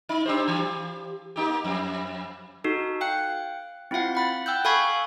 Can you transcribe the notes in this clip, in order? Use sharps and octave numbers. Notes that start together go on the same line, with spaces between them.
D#4
D4 G4 C5
E3 G4
A#3 D#4 G4
F2
D#4 F#4 A4
F5 G5 F#6 C#7
C4 E4 F4 F5 F#5
F#5 B5 A6
G5 E6 F#6 G6
A4 F5 G#5 B5 C#6 G#6